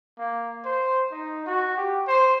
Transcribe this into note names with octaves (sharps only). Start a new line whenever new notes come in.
A#3
C5
D#4
F#4
G4
C5